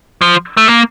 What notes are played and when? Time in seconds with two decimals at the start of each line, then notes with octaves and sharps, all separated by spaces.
0.21 F3
0.57 A3
0.68 A#3